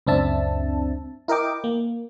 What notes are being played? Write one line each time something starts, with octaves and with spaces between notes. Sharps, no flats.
C#2 F#2 C4 D4 E5 A5
E4 A#4 D#5 G5 D6
A#3